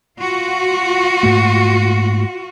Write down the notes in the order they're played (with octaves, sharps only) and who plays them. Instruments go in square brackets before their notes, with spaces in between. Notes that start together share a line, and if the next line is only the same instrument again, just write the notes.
[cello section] F4 F#4
[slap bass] G#2 A3 A#3